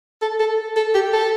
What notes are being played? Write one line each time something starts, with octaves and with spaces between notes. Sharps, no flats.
A4
A4
A4
G4
A4